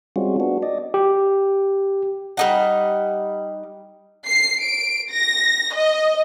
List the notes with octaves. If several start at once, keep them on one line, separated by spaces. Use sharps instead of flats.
G3 G#3 C4 C#4 F4 F#4
B3 D4 F#4
D5 D#5
G4
G3 D#4 F#5
C7
D7
A#6
D#5